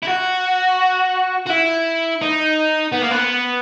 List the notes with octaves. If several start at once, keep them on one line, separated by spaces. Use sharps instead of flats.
E4
F#4
F#4
E4
D#4
B3
A#3
B3